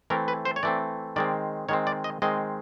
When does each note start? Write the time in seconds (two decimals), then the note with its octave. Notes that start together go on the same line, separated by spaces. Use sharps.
0.10 E3 A3 C4 A#4
0.28 B4
0.45 C5
0.56 C#5
0.63 E3 A3 C4 D5
1.16 D#3 G#3 C4 D5
1.69 D#3 G#3 C4 C#5
1.87 D5
2.04 D#5
2.22 D#3 G#3 C4 D#5